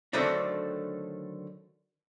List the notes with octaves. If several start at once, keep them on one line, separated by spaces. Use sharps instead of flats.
D3 D#3 F#3 A3 C4 D4